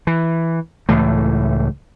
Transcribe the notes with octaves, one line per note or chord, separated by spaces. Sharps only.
E3
C#2 A2 E3 A3